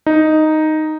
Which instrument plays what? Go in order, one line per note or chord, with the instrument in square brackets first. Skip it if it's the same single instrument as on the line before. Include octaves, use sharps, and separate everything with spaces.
[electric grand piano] D#4